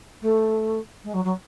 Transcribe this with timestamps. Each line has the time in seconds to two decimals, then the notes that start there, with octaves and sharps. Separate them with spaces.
0.21 A3
1.03 G#3
1.13 F#3
1.24 F#3